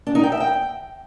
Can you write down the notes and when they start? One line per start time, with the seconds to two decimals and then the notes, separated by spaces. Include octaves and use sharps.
0.07 D4
0.15 D#4
0.23 G5
0.32 E5
0.40 G5